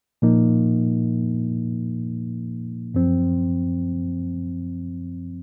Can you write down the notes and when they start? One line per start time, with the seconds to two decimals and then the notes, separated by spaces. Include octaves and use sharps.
0.22 A#2 F3 A#3 D#4
2.94 F#2 F3 C4